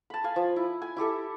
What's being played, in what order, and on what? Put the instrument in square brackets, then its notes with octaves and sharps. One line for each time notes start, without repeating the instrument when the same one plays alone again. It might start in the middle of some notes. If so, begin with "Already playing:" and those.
[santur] A5 B5
F5 G#5
F3
E4
G#5
E4 G4 A4 E5